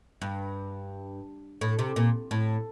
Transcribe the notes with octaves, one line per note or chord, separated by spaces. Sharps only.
G2
A2
C3
A#2
A2